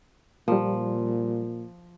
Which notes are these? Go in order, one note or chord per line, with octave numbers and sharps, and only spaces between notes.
A#2 F3 G3 A#3